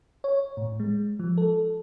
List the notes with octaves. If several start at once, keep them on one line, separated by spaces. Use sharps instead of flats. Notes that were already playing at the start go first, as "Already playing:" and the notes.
C#5
A2
G#3
F3
A4